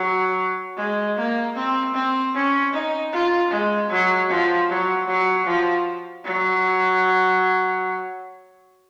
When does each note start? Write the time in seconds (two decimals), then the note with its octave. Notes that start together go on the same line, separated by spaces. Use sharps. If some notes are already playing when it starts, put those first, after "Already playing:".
Already playing: F#3
0.77 G#3
1.17 A#3
1.56 C4
1.94 C4
2.35 C#4
2.73 D#4
3.13 F4
3.51 G#3
3.90 F#3
4.29 F3
4.69 F#3
5.08 F#3
5.47 F3
6.25 F#3